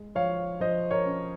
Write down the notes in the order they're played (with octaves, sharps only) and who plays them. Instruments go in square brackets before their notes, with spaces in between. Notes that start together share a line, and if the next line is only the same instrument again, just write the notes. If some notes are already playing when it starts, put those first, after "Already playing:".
Already playing: [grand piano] G#3
F3 C#5 F5
F3 C5 D#5
A#4 C#5
C#4